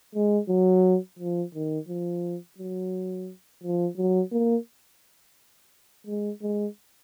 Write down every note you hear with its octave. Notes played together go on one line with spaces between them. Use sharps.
G#3
F#3
F3
D#3
F3
F#3
F3
F#3
A#3
G#3
G#3